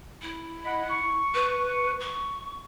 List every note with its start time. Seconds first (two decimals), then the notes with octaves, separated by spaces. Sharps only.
0.22 E4
0.65 D#5 F#5 B5
0.91 C#6
1.34 B4
2.00 C#6